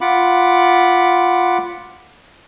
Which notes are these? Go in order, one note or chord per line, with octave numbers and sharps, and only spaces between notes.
F4 F#5 B5 D6